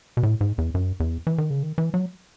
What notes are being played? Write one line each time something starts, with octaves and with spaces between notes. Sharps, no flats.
B2
A2
G#2
E2
F#2
E2
E3
D#3
C#3
D#3
E3
F#3